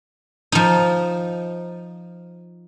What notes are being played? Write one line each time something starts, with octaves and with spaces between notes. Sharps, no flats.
F3 D#4